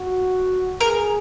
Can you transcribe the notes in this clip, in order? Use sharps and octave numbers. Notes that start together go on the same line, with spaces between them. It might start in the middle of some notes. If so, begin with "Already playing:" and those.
Already playing: F#4
G#4 A#4